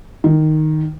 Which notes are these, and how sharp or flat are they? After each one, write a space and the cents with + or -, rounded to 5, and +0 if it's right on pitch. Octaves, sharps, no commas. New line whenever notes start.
D#3 -5